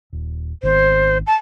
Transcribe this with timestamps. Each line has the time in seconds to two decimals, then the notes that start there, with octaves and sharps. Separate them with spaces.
0.13 D#1
0.63 G#1 D#3 B3 C5
1.27 A5